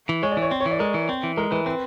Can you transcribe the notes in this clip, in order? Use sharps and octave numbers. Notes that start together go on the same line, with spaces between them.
E3
G#3 C#5
D5
E3
C#5
C4
C#5
E3
D5
G#3 A#4
E3
C4
E3
G#3 A#4
E3 B4
C4 B4